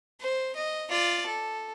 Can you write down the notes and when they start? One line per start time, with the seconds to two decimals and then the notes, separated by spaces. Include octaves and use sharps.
0.21 C5
0.56 D#5
0.90 F4 D5
1.27 A4